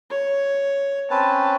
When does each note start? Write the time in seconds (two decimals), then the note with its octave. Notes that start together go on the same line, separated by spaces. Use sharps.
0.10 C#5
1.11 C4 C#4 B4 A5